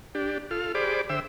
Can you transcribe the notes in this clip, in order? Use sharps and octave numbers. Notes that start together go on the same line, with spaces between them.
D4 G4
F4 A4 F6
G4 G#4 C5 D5 B5 D6
D3 C5 E5 G5 E6